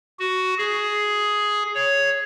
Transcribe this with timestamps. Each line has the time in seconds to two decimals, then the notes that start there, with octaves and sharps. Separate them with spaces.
0.19 F#4
0.58 G#4
1.75 C#5